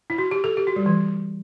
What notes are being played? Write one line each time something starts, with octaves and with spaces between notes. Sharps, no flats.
E4
F#4
G4
A4
G4
F#4
G3
E3